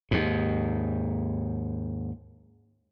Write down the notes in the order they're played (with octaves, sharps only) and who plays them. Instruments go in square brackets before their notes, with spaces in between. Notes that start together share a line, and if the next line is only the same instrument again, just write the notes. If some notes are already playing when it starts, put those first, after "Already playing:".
[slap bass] D#2 G#2